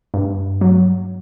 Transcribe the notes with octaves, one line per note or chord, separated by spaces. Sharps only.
G2
F#3